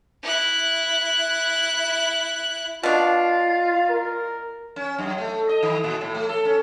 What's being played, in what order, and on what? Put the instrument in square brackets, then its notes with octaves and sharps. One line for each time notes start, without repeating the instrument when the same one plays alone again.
[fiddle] E4 F#6
[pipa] B2 D4 [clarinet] F4 [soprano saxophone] F5
[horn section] A#4
[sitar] C#4
F#2
A3
D#5
D#3
A#2
A2
A3
A4
C#4